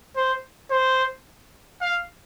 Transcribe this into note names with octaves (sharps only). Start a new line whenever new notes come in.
C5
C5
F5